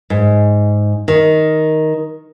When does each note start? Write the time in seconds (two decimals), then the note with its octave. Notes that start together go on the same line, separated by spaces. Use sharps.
0.10 G#2
1.08 D#3